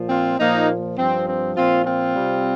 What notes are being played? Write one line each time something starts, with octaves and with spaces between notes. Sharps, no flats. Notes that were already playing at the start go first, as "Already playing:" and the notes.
Already playing: A#2 F3
C4 F4
A#2 F3 A#3 D#4
G2 F3 C4
C4
A#2 F3 C4 F4
C4 F4
C3 G3